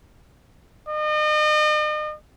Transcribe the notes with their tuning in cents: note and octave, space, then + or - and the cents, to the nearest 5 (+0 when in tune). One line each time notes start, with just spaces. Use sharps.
D#5 -40